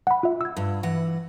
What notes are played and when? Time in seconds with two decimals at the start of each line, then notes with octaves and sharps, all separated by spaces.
0.07 F#5 B5
0.23 F4 E5
0.41 E6 G#6
0.57 G2
0.83 E3 F#5